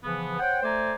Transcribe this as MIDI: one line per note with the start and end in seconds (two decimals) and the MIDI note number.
0.04 0.39 49
0.04 0.39 52
0.04 0.39 53
0.04 0.39 59
0.40 0.60 72
0.40 0.60 73
0.40 0.60 78
0.40 0.60 79
0.63 0.94 57
0.63 0.94 69
0.63 0.94 72
0.63 0.94 74
0.63 0.94 80
0.63 0.94 82